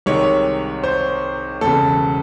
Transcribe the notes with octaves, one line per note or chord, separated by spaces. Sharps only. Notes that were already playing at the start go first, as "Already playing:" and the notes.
C2 C3 D#3 G#3 C#5
C5
E1 E2 C#3 A4